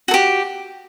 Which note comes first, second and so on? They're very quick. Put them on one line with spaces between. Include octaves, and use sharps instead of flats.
F#4 A4 G4